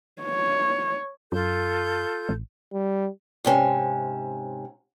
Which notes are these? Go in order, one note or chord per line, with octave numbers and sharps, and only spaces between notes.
C#5
F#2 F4 A4 G6
A1
G3
G#2 C3 C#4